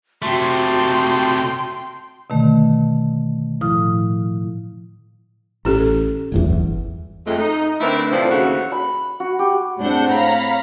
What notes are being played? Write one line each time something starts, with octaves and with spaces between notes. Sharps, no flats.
C3 A3 F#4 G5 C6
B2 D3 D#3 A3
A2 F3 E4 D#6 F6
A1 C#4 G4 A4
D1 G1 E2
F2 G#3 A3
D#4
D3 A3 C4 E4 A#4 B4
A2 C3 E3 F3 D4 F4
D#2 C#3 A3 F#4
B5
F#4
G4
A2 C4 D4 G#4 F#5 G6
C#5 F5 A#5 B5